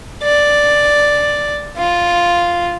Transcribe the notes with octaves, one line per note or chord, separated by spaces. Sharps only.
D5
F4